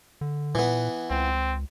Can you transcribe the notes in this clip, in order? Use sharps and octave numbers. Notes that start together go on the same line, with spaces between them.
D3
A#2 E3 B3
C#2 C4